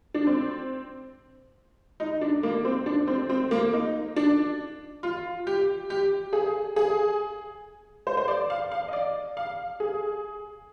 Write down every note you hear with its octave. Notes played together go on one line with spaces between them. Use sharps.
D4
C4
D#4
D4
A#3
C4
D4
C4
C4
A#3
D#4
D4
F4
G4
G4
G#4
G#4
C5
C5
D5
F5
F5
D#5
D5
F5
G#4